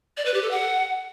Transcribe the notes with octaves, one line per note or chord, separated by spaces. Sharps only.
D5
B4
G4
A4
F#5